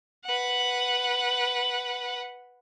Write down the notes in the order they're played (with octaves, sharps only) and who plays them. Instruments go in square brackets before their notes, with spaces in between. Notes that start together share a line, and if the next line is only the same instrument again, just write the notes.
[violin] B4 F#5